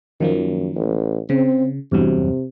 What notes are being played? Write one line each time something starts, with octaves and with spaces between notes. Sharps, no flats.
F#2 D#3 F3 A#3
A1
C#3 C4
E2 G2 C3 F#3